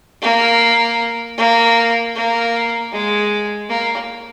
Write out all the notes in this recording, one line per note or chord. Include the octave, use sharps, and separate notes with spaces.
A#3
A#3
A#3
G#3
A#3